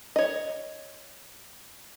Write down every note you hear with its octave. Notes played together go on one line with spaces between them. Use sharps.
C#5 D#5